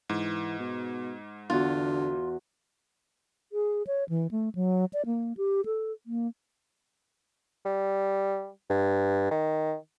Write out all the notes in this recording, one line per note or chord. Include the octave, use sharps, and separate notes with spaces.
G#2 E3
B2
E2 D3 F4 F#4
G#4
C#5
E3
A3
F#3
D5
A#3
G4
A4
A#3
G3
G2
D#3